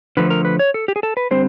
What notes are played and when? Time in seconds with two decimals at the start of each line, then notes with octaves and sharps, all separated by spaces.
0.17 D3 F3 A3 B4
0.30 A#4
0.45 B4
0.59 C#5
0.74 A4
0.88 G4
0.96 G#4
1.03 A4
1.17 B4
1.31 D3 G3 C4 C5